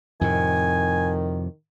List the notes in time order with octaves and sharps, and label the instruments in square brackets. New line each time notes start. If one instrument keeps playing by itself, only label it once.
[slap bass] F2 A2 C3 [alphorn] D#3 [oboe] G#5